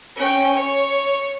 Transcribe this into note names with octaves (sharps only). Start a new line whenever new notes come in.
C#4 G5
C#5